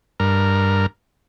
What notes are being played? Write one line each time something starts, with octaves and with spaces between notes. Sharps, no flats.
G2 A#4